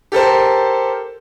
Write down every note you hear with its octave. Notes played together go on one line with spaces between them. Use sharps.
G4 A4 A#4 C5